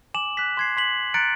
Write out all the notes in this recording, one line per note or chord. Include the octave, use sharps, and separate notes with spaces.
G#5 D6 E7 F#7
F#6 B6
C6 G#6 C7
C6 B6 F#7
A#5 F#6 A6 C#7 D7